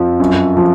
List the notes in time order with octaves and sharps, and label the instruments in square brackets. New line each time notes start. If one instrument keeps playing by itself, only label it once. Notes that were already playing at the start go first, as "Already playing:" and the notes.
Already playing: [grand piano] F2 F3
F#2
F3